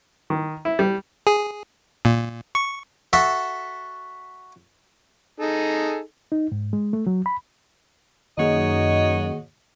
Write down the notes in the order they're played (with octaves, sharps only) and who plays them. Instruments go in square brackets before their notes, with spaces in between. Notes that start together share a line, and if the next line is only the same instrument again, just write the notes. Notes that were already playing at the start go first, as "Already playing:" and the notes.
[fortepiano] D#3
E4
G3
[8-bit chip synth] G#4
A#2
C#6
[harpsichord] F#4 A4 E5
[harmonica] D#4 G#4 A4
[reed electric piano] D#4
G#2
G#3
A3
F#3
B5
[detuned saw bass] F#2 [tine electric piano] D#3 A#3 G#4 [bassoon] D#4 [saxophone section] F#4 C#5 D#5